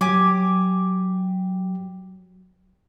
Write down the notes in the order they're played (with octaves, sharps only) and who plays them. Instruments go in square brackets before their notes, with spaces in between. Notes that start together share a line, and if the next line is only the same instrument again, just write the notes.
[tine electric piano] F#3 [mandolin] G4 G#5 D6